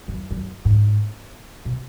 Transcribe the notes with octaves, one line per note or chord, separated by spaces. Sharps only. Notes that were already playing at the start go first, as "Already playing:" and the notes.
F#2
F#2
G#2
B2